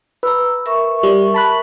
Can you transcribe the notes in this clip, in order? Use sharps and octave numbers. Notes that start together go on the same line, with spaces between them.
B4 A#5 E6
A#4 E5 C#6
G3
A5 B5 F#6